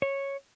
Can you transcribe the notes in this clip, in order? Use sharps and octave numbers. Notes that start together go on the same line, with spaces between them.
C#5